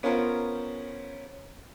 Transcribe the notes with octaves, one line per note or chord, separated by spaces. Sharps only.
B3 C#4 F4 A#4 C5